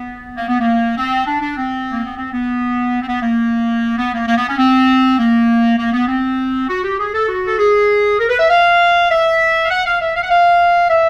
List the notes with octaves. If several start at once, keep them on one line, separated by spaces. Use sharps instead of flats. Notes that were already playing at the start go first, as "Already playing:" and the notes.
Already playing: B3
A#3
B3
A#3
C4
D4
D4
C4
A#3
B3
C4
B3
C4
B3
A#3
B3
A#3
A#3
B3
C#4
C4
A#3
A#3
B3
C4
F#4
G4
G#4
A4
F#4
A4
G#4
A#4
B4
E5
F5
E5
F5
F#5
F5
E5
F5
F#5
F5
E5